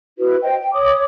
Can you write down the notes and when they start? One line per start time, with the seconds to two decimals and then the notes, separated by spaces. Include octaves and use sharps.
0.18 E4 F#4 B4
0.42 C5 D#5 G5
0.61 G5
0.73 C#5 D6 D#6